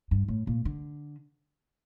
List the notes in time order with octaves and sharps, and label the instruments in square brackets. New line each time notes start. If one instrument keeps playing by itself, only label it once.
[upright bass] G2
A2
A#2
D3